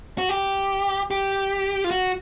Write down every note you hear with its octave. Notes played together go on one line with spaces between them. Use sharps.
F#4
G4
G4
F4
F#4